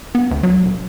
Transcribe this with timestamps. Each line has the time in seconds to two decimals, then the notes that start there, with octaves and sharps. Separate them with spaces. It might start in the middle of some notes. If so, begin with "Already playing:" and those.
0.15 B3
0.31 D2
0.43 F#3
0.65 E1